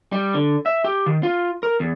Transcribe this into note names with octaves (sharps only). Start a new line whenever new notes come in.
G3
D3
E5
G4
D#3
F4
A#4
E2